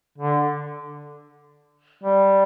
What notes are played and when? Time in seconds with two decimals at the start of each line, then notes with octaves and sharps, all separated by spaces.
0.18 D3
2.03 G3